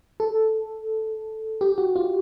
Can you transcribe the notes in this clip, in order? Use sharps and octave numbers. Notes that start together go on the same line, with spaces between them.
A4
G4
F#4
F4